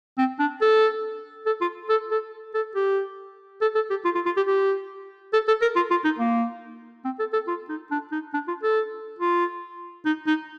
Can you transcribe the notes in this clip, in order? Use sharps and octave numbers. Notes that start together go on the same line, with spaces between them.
C4
D4
A4
A4
F4
A4
A4
A4
G4
A4
A4
G4
F4
F4
F4
G4
G4
A4
A4
A#4
F4
F4
D#4
A#3
C4
A4
A4
F4
D#4
D4
D#4
D4
F4
A4
F4
D#4
D#4